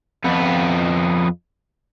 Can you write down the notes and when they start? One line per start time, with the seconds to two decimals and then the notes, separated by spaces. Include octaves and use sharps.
0.24 F2 B3